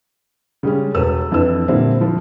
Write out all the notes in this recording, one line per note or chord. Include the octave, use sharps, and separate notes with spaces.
C#3 G3 G#3 C#4
E1 A4 B4 E6
F2 E3 D4 B4 E6
A#2 D3 G3 C4 E4
F3